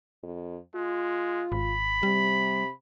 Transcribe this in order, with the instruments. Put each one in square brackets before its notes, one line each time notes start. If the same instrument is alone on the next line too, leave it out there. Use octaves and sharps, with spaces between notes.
[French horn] F2
[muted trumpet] G#3 [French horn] F4
[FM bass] G#1 [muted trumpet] B5
[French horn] C3 [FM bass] G3